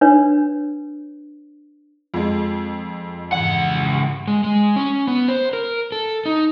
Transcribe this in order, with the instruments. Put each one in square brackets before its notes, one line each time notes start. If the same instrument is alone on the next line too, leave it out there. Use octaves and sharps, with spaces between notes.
[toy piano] D4 B4 C#5
[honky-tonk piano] F2 G#3 [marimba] F4
[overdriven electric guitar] C#2 F#5 [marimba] G#2 E3
[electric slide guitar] G#3
G#3
C#4
B3
C5
A#4
A4
D#4